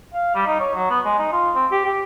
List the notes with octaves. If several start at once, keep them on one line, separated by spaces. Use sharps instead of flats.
F5
G3
D#4
C#5
F#3
B3
G#3
D#4
F4
C4
G4
G4